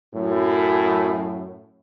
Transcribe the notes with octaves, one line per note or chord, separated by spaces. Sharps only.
F#2 A2